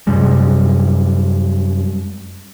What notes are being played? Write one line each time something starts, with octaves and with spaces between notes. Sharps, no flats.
F#2 C3 G3 G#3